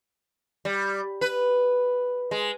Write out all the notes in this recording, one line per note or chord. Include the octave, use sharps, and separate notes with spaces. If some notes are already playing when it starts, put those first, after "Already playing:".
G3
B4
G#3